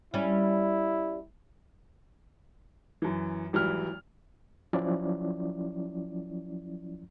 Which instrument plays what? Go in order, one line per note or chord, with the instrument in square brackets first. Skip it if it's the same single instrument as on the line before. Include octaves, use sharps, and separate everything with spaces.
[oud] G3 C#4 [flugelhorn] E4
[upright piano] F#2 E3
G#1 E3 F#3 G3 E4 F6
[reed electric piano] F3 F#3 C#4 E4 D5